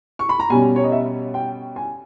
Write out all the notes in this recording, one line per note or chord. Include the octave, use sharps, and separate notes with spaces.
C#6
B5
A#5
B2 G3 C#4 G#5
C#5
D#5
E5
G5
G#5